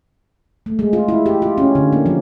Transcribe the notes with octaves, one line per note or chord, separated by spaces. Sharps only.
A3
G#3
F4
E4
G4
F4
C#4
D3
A#3
F3